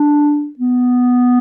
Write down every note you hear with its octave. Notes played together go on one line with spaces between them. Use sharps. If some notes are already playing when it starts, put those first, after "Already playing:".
Already playing: D4
B3